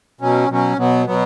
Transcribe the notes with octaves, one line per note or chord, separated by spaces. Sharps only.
B2 F#3 C#4
B2 F#3 C#4
B2 F#3 B3
B2 F#3 B3